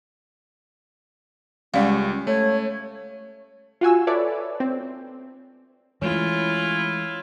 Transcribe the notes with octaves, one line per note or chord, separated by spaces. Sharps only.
C#2 G3 G#3 C#4 D5 F5
A3 C#5
F4 F#4 G#5 E6
A4 B4 C#5 D5 E5
C4
E3 G#3 A3 C#4 E4 F4